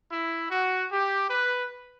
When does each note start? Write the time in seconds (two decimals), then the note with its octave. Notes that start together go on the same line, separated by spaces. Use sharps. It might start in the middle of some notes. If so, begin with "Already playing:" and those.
0.10 E4
0.50 F#4
0.90 G4
1.30 B4